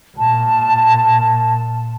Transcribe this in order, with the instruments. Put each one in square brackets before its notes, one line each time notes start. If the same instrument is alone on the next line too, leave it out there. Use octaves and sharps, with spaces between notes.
[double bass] A#2 [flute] A5